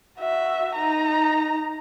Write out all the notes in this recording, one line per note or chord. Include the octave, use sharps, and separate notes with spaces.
F#4 E5
D#4 A#5